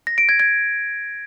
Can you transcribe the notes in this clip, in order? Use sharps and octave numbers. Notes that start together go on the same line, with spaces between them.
A#6
D7
G#6
G#6